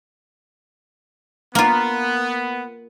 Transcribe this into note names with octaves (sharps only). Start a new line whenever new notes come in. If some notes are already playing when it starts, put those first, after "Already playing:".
A#3 B3 F4